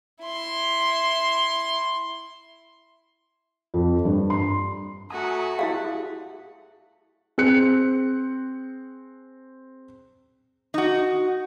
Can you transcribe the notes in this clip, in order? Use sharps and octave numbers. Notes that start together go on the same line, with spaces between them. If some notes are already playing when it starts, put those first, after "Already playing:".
E4 C6
F2
G2
C6
A3 F#4 G#5 A#5 D#6
E4 G4 G#4 E5 F5
C4 G#4 F#6 C#7
D#4 F#4